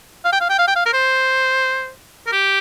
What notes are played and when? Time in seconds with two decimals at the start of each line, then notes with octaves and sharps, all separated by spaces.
0.25 F5
0.33 G5
0.41 F5
0.49 G5
0.59 F5
0.68 G5
0.76 F5
0.86 A#4
0.93 C5
2.27 A#4
2.32 G4